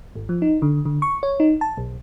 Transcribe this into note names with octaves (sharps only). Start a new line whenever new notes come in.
G#1
F3
D#4
D3
D3
C#6
C#5
D#4
A5
B1